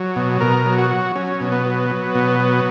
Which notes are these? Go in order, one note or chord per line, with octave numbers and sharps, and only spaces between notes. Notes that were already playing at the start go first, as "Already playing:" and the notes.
Already playing: F#3
B2
B2 A#4
F#3
F#4
F#3
F#3 C#4
B2
B3
F#3
F#3
B2
F#3